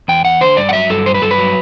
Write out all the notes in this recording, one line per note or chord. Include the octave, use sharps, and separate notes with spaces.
E2 G5
E2 F#5
D3 C5
G2 D5
F#5
F#3 E5
G2 A4
F#3 C5
B4
G2 A4
B4
F#3